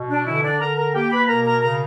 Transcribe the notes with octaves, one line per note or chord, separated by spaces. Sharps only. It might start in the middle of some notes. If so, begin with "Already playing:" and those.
Already playing: B2
D4
D3 E3 E4
D4 D5
D3 A#4 A#5
A#4 A#5
A#3 G4 G5
B4 B5
B2 A#4 A#5
A#4 A#5
C#3 A#4 A#5